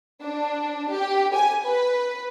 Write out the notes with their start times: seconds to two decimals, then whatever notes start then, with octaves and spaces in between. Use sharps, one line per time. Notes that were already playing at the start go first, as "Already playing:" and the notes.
0.22 D4
0.91 G4
1.35 G#5
1.65 B4